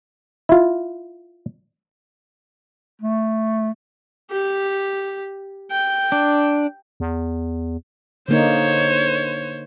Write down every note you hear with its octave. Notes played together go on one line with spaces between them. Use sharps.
E4 F4
A3
G4
G5
D4
E2
D3 A#3 D#4 C5 C#5